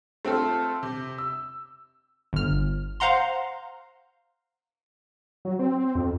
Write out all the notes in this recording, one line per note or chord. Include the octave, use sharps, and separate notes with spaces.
A3 C4 F4 A4
C3
E6
G1 F6
C5 F5 F#5 A#5 C6
F#3
C4
F2